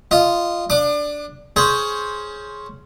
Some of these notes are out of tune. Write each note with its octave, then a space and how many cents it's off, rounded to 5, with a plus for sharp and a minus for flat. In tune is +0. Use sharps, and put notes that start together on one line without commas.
F4 -10 D#5 -10
D4 +0 D6 +35
C#4 +0 G#4 +15 C5 +0